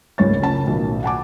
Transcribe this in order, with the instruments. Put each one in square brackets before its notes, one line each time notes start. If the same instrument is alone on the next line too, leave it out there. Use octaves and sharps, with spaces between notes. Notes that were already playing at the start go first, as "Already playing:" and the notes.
[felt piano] F#1 C#2 G#2 C#5 A6
F#1 C#4 A5
B1 A2 D#3
F#5 G#5 A5 D6